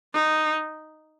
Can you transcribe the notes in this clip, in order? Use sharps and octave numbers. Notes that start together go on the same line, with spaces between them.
D#4